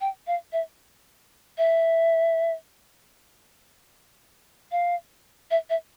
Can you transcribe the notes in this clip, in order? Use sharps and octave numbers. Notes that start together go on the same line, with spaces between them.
G5
F5
E5
E5
F5
E5
E5